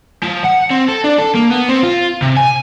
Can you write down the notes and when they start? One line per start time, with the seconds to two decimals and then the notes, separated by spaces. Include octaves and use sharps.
0.23 F3
0.44 F#5
0.70 C4
0.88 A4
1.04 D4
1.19 A4
1.35 A#3
1.50 B3
1.69 C4
1.83 F4
2.22 C3
2.37 G#5